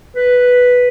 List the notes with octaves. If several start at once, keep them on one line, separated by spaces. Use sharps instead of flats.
B4